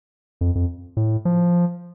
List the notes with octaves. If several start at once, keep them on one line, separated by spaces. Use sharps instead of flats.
F2
F2
A2
F3